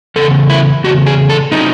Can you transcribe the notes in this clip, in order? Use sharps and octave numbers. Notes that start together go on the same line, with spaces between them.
E2 C#3 A4
E4
E2 C#3 F#4
G#4
A4
C3 F#3 C#4 D#4